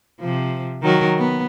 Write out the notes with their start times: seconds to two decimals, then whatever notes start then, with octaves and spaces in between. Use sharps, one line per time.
0.20 C3 F3
0.82 D#3 F#3 A#4
1.18 B3